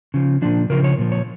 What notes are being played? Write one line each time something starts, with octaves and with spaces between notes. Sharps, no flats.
C#3 F3
A#2 F3 D4
C#3 F3 A#4
C#5
A#2 F3
C#5